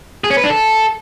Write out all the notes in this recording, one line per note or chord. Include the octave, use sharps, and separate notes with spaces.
G#4
C#4
B4
D4
A4